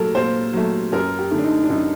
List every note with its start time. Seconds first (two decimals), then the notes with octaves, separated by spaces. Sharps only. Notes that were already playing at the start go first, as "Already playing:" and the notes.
Already playing: A#2 F#3 A3 A4 A#4
0.15 A#2 C5
0.53 F#3 A3
0.92 F#2 A#4
1.19 G4
1.31 D3 A3
1.38 D4
1.44 D#4
1.64 D4
1.70 F#2 D#4